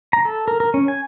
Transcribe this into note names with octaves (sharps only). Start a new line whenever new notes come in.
A#5
A4
A#4
A#4
C#4
G#5